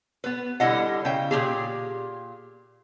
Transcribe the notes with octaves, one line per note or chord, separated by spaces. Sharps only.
B3 B4
D3 G3 E4 D#5 F#5
C#3 G5
A#2 C#4 G4 G#4